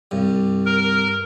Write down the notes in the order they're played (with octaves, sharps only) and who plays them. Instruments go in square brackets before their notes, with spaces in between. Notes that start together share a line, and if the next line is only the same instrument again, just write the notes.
[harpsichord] C2 G2
[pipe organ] A#4